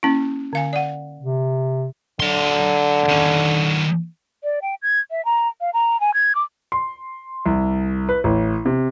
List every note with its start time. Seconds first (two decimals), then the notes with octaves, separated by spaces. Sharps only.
0.03 A#3 C#4 E4
0.53 D3 F5 G#5
0.73 D5 F#5
1.21 C3
2.20 D3 F#3 C6
3.08 D#3 C#4
4.44 D5
4.62 G5
4.82 G#6
5.11 E5
5.25 A#5
5.61 F5
5.74 A#5
6.00 G#5
6.14 G#6
6.35 D6
6.72 C6
7.46 C2
8.09 B4
8.24 A1
8.65 C3